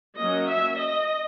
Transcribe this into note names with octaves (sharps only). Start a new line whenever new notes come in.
F#3 A#3 C#4 D#5
E5
D#5